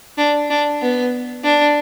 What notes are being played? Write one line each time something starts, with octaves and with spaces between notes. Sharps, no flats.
D4
D4
B3
D4